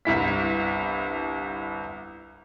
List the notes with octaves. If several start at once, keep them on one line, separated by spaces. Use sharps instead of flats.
G1 C2 E4 B6